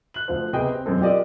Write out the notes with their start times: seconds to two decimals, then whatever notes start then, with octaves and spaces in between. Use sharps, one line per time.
0.14 F#6 F#7
0.28 D2 F3 C5
0.53 C3 B3 G#4 D#5 G5
0.72 C4
0.86 E1 F#2 G#3 C4 A4
1.01 F4 G4 A#4 D5 D#5